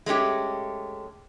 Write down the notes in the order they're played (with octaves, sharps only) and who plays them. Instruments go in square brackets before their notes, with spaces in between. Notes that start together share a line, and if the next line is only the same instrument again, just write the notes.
[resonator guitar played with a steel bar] G#3 A3 C#4 G4